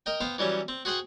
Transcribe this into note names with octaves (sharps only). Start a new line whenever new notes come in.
A#4 D#5 G5
B3 C5 F5 G5
E3 F#3 G3 C#4
C4
F#4 G#4 C5 F#5 G5